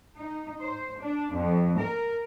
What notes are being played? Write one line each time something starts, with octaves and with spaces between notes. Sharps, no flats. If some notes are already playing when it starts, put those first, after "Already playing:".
D#4
C5
D4
F2
A#4